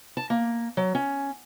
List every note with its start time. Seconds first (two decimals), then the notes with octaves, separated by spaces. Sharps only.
0.17 A5
0.30 A#3
0.77 F#3
0.95 C#4